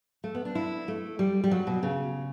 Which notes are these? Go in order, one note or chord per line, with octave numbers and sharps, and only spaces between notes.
A3
B3
D4
E4
A3
G3
G3
F#3
B2
C#3